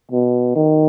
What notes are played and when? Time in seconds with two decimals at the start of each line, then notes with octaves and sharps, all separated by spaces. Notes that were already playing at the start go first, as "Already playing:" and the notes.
0.12 B2
0.56 D#3